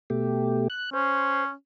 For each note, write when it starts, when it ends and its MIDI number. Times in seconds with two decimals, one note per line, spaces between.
0.10 0.68 47
0.10 0.68 57
0.10 0.68 67
0.70 0.90 90
0.93 1.52 61
0.93 1.45 72